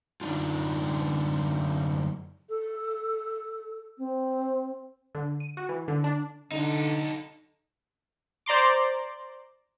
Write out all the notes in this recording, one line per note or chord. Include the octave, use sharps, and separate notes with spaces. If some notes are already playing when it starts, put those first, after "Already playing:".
F#2 D3 G#3 D4 D#4 F4
A4
C4
D3
D#7
F#4
E3
D3
D4
D3 D#4 A4
C5 D5 A#5 C6 D6